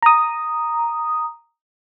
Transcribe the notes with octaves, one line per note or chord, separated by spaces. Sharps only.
A#5 D#6